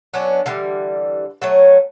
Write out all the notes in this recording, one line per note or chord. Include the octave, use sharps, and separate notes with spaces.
F#3 B3 C#4 D4
D3 E3 G3
F#3 A3 C#4